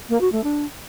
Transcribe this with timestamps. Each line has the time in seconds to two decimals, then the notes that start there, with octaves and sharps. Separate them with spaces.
0.09 A#3
0.21 F#4
0.32 A3
0.44 D4